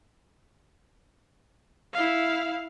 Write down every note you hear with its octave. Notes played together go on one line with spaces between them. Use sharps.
E4 F5